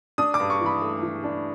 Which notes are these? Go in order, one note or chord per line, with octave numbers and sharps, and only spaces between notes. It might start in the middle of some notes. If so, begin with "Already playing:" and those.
D4 D#6
D6
G2
C#6
E3 B5
A3
E3
D4